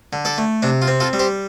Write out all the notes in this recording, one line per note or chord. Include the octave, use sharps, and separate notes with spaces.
D3
A4 D5
A3
C3 D4
F4
C4
F4 A4
G3
G4 C5